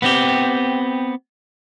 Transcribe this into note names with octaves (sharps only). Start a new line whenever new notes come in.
B3 C4 G4